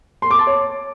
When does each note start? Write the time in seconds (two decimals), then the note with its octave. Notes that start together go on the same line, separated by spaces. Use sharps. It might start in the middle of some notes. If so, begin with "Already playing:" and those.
0.22 C6
0.31 D6
0.39 A5
0.47 C#5